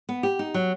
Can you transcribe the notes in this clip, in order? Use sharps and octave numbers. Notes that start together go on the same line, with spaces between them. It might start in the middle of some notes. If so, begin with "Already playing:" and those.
B3
G4
D#4
F#3